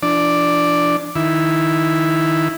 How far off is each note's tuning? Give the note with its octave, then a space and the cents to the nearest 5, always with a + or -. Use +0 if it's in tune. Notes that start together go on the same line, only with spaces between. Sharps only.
F3 -45 D4 +0 D5 +0
D#3 +0 E4 +0